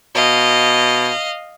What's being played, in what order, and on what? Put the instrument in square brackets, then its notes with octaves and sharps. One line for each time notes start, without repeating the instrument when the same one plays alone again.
[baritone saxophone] B2 [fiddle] D#5 F5